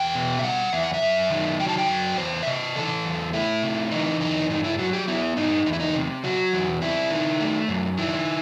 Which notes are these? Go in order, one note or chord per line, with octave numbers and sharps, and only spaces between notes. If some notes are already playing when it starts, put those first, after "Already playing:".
Already playing: E2 G5
B2
E5
G3 F#5
E2 E5
F#5
E5
F#2
D#3
F#3 G5
A5
G5
F#2
E2 C5
E5
C3 D#5
E3 A4
E2
A3 E4
C3
E3 D#4
E2 D#4
G2 D#4
E4
F#3 F#4
G4
B3 E4
G2 D#4
E2 D#4
E4
D#4
C3
F#3 F#4
E2
C4 E4
D#3
A3
F#2
D#3 E4